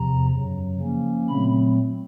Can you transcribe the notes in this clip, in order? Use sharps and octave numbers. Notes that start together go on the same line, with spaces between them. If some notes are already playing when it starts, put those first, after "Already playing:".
Already playing: E2 C3 F3 A#5
F#2 C#3 F#3
C#3 F3 A#3 C#4
A#2 F#3 A3 C4 B5